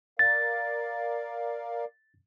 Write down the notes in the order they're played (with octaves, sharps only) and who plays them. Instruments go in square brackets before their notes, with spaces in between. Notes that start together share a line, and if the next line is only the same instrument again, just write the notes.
[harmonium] A#4 D5 F5 [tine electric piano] A6